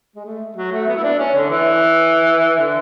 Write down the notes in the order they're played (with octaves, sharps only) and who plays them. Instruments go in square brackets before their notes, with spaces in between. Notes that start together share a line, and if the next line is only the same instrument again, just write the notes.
[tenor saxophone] G#3
A3
F#3
A3
B3
E4
D4
C#4
D3
E3
D3